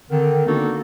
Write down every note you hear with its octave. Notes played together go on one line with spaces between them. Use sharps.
D3 D#3 C4
A#3 B3 D4 D#4 F#4 A4